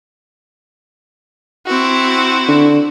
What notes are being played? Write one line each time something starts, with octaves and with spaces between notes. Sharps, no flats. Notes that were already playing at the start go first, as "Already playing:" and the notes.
C4 E4 F#4
D3